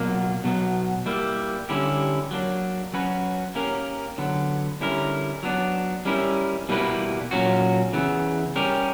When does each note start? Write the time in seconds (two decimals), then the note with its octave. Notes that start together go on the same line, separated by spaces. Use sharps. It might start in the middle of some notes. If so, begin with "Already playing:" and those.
Already playing: B2 F#3 A#3
0.44 B2 F#3 B3
1.06 G3 A#3 E4
1.69 D3 G3 C#4 E4 G4
2.31 F#3 A#3 D4
2.93 F#3 C#4 F#4 B4
3.55 A#3 C#4 G4 A#4
4.18 D3 F#3 B3
4.81 D3 G3 C#4 E4 A#4
5.43 F#3 B3 D4
6.05 G3 C#4 E4 A#4
6.69 B2 G3 A#3 E4 B4
7.31 A#2 F#3 C#4 F#4
7.93 C#3 E3 B3
8.56 G3 C#4 G4 A#4